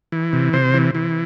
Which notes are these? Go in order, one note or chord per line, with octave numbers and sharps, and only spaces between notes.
E3
C3
C3 C5
E3
E3